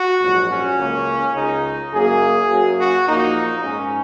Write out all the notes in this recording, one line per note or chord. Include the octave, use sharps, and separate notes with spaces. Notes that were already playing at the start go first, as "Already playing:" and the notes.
Already playing: F#4
A#1 G#2 F#3
C#4
C#2 C#3 A#3
C#2 C#3 G#3 D#4
F#2 C#3 A#3 G#4
F#2 F#3 A#3
F#4
A#1 A#2 A#3 D#4
G#2 G#3 C#4